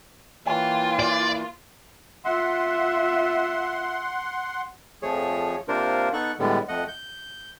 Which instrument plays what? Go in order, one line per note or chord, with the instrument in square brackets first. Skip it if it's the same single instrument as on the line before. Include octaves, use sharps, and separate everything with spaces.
[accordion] E3 A#3 [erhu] F4 [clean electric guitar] C#5 G5
[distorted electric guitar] D5
[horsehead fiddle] F4 E5 [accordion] F#5 C6
[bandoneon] F2 F3 A3 G#4 C#5
C3 A#3 D4 F4 A#4 C5
B3 D#4 A4 F#5 C#6 F#6
A2 D3 G3 G#3 B3
F2 A3 D#5 F#5
G6